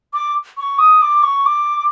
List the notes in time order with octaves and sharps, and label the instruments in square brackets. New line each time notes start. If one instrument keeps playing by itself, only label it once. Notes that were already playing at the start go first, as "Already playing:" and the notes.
[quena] D6
C#6
D#6
D6
C#6
D6